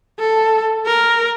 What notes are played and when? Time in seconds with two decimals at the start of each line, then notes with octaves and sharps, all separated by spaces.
0.20 A4
0.87 A#4